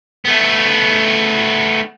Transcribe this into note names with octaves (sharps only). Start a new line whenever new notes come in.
A3 B3